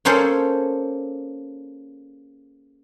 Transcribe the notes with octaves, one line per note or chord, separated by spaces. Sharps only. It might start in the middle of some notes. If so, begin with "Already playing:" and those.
A#3 C#4 G#4 A4 C5